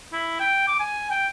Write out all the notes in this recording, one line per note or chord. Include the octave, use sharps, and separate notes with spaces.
E4
G5
D6
G#5
G5